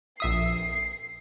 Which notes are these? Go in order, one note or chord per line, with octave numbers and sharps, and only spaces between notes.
A#1 E5 D#6 C7